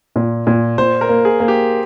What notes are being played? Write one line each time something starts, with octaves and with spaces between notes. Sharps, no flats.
A#2
A#2
A#2 C5
A#4
A#3
G#4
A#3
G4